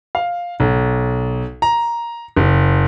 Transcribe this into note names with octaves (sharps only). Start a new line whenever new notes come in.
F5
B1
A#5
F#1